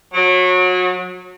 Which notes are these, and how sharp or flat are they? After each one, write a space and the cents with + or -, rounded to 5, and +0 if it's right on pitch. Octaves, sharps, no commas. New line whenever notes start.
F#3 -25